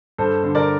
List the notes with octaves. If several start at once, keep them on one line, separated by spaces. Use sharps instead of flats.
G2 A4 C5
D3
A#4 D5